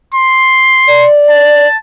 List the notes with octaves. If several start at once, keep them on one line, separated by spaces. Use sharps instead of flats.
C6
D5
A5